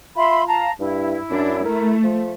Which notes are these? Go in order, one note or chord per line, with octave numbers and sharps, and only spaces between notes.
F4 E5 B5 C6
F5 A5 A#5
G2 E4
F#2 D4
A3 A#4
F3